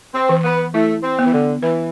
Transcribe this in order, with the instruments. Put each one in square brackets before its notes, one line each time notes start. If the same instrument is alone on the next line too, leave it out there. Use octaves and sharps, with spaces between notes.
[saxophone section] C4
[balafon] E3
[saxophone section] B3
[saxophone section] A3 [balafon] E4
[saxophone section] C4
[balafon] B3
[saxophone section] E3
D3
[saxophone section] E3 [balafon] B4